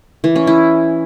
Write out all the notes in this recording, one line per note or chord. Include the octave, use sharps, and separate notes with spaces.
E3
C#4
E4